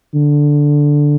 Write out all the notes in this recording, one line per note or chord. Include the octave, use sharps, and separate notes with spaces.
D3